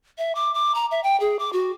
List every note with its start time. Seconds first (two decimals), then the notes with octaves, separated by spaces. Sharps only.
0.18 E5
0.35 D6
0.54 D6
0.75 A#5
0.91 E5
1.03 G5
1.20 G#4
1.39 D6
1.53 F#4